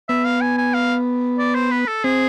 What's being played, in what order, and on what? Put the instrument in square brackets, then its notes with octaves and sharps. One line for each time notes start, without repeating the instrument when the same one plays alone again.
[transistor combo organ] B3 [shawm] E5
[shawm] F5
G#5
G#5
F5
D5
C5
B4
A4
[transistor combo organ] C4 [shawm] G#4